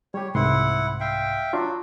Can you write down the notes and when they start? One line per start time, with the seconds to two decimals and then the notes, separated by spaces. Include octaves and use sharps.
0.14 G3 G4 C#5
0.35 C2 G#2 E4 F#5 C6
1.00 E5 F5 G5
1.53 F#3 D4 F4 F#4